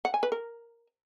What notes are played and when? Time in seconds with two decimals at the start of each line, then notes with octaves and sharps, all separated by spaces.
0.05 F#5
0.14 G#5
0.23 B4
0.32 A#4